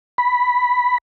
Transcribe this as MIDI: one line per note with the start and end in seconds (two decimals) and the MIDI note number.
0.18 0.98 83